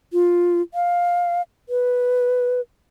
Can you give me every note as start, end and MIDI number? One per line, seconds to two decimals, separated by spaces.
0.13 0.62 65
0.74 1.41 77
1.69 2.61 71